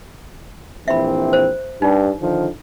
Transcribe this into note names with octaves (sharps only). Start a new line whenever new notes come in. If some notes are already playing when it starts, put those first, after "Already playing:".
A#1 E3 C4 E5 B5
C5
G2 D#4
D3 D#3 F3